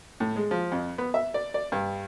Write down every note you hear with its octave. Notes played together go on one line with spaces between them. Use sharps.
A2
G#3
F3
F2
B3
E5
D5
D5
G2